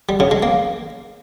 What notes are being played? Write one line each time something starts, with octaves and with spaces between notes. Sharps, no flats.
G3
C#3
G#3
A#3